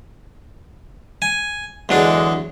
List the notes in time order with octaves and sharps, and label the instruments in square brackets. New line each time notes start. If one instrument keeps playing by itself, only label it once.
[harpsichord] G#5
[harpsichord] E2 F#3 D4 [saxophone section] D3 G#3